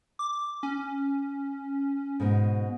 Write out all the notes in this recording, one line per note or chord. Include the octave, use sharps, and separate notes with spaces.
D6
C#4
G#2 B2